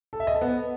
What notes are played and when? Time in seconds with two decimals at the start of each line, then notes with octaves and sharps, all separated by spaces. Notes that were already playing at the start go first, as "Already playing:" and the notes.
0.13 A4
0.20 E5
0.27 D#5
0.34 A4
0.41 B3